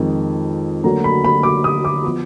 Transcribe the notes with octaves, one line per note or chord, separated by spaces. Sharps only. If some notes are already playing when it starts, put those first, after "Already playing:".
Already playing: F2 D#3 G#3
D2 D3 F#3 A#3 A#5
B5
B5
D6
D#6
D6
F3 B3 D6